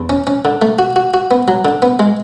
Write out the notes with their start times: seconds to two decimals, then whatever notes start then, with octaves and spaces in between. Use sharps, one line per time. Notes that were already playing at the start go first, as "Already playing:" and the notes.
Already playing: E2
0.10 C#4
0.27 C#4
0.45 D3
0.62 A3
0.79 F#4
0.96 F#4
1.14 F#4
1.31 B3
1.48 F#3
1.65 D3
1.82 B3
1.99 G#3